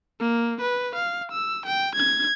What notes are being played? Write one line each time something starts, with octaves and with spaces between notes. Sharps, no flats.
A#3
B4
F5
E6
G5
G#6